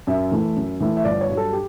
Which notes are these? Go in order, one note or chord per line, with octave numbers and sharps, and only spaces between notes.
F#2 E5
E3 A3 E4
F#2
E3 A3 E4
E5
G1 D5
C#5
G2 F#3
A4
G4